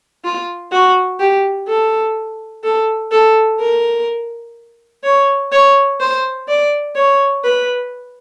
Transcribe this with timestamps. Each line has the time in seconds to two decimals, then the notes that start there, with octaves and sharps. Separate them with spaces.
0.24 F4
0.72 F#4
1.20 G4
1.68 A4
2.64 A4
3.12 A4
3.60 A#4
5.04 C#5
5.52 C#5
6.00 C5
6.48 D5
6.95 C#5
7.44 B4